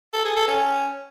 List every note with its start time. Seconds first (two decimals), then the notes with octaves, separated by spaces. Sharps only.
0.14 A4
0.25 G#4
0.36 A4
0.48 C#4